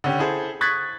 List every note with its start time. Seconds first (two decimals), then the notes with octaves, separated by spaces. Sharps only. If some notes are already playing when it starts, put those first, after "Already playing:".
0.04 D3 C#4 G4
0.19 E4 G#4 A4 C5
0.61 C#6 D#6 F#6 G#6 A6 B6